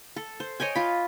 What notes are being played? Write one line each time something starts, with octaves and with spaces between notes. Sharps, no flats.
A4
C5
C#5 D#5 G5 G#5
F4 B5